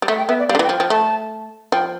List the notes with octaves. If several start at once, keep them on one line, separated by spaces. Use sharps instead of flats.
G3
A3 E5
G5
B3 E5
D5
G3 F5
D3
E3
G5
F3
G5
F3
A3 A5
F3 G5